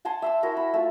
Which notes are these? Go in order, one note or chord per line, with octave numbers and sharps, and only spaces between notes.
F#5 G#5 A5 C6
E5 C6 E6
E4 F#4 A#4
B5
A3 F4